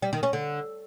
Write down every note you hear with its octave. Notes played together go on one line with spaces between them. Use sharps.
G3
D#3
C#4
D3